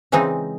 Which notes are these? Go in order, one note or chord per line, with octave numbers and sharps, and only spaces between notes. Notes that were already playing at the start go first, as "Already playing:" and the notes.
C#3 E3 G#3 C4 D#4